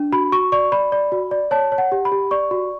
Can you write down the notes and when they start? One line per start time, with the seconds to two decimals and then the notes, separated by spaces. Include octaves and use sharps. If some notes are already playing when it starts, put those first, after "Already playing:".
Already playing: D4
0.12 F#4 B5
0.32 F#4 C#6
0.52 D5 C#6
0.72 D5 B5
0.92 D5
1.12 F#4
1.31 D5
1.51 C#5 A5
1.72 C#5
1.78 F#5
1.92 G4
2.05 B5
2.12 G4
2.31 D5 C#6
2.51 F#4